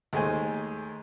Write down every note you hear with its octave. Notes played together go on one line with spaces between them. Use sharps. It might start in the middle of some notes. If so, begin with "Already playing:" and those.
D#2 G#3 A3 C5 G#5